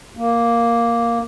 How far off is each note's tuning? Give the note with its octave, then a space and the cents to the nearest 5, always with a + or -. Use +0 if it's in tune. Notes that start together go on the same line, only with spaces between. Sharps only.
A#3 +0